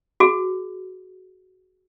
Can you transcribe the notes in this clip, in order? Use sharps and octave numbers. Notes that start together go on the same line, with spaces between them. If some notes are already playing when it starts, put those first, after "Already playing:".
F#4 G#4